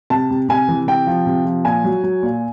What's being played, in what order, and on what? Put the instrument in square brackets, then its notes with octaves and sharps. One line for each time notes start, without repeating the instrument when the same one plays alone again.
[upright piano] C3 A5
C3
C3 G#5
E3
C3 G5
F3
C3
F3
A#2 G#5
F#3
F#3
A#2